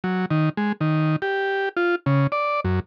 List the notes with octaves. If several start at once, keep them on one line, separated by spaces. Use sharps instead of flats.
F#3
D#3
G#3
D#3
G4
F4
C#3
D5
F#2